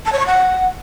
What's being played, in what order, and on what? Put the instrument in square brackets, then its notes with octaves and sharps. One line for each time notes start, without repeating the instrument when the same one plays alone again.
[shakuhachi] A5
C#5
C#6
F#5